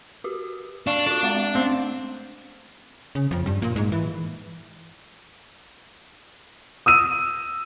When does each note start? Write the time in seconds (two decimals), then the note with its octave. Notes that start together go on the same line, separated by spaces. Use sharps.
0.24 F#4 G4
0.87 D4 F5 C#6 C7
1.06 D4 F4 F#4
1.23 G#3 F5 F#5
1.55 A3 C4
3.15 C#3
3.31 F2
3.46 G2
3.62 A#2
3.76 G#2
3.92 E3
6.86 D#6 E6 D#7